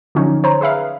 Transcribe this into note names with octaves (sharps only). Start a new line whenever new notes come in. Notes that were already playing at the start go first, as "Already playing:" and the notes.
D3 F3 F#3 C#4 D#4
C5 C#5 A#5
G#4 B4 E5 F5